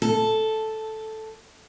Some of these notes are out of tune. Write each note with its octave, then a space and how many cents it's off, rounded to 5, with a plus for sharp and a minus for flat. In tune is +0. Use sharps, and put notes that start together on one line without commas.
A4 -5